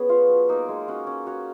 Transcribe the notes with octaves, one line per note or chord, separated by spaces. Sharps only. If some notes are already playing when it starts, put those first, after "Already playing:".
Already playing: B3 C#4 G#4 C#5
F4 B4 F5
F#3
A#3 D#4 A#4
G#3
C#4 F#4
C#4
F#4 C#5